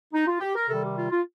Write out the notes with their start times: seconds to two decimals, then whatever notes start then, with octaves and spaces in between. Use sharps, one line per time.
0.14 D#4
0.27 F4
0.41 G4
0.55 A#4
0.69 C3 D#3 G3 A4
0.83 G4
0.96 F4
1.11 F4